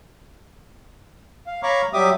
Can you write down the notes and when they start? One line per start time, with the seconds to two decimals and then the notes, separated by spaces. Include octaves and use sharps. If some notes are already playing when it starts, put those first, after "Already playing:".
1.47 F5
1.63 C#5 F5 A#5 B5 C#6 D6
1.93 F#3 G3 G4 E5 D6 D#6